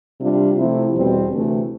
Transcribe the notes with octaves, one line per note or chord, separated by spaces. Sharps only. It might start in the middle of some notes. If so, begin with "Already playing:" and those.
C3 G3 D4 F4
C3 F3 A3 E4
E2 B2 G3 C4
D2 C3 E3 A3